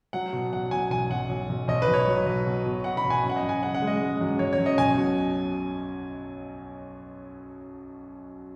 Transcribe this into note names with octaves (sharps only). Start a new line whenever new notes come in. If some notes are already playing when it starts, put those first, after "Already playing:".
F#3 F#5
B2
B1 F#5
B2 G#5
B1 G#5
B1 F#5
B1
B1
B1 D#5
B4
B1
C#5
F#3
B1
B2
B2
B2 F#5
B5
B1
G#5
F#2
F#5
D#5
F#2
G#5
C#3 F#5
F#5
G#3
D#5
G#3
F#2
F#2 C#5
C#5
F#2
D#5
B1 G#5
B2